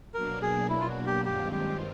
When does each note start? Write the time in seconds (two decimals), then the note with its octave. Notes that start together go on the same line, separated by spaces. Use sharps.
0.14 B2 F#3 A#3 D4 A#4
0.42 G#4
0.70 E4
0.81 F4
0.89 F#4
1.06 G4
1.25 G2 D#3 G#3 C4 F4 G4
1.52 G4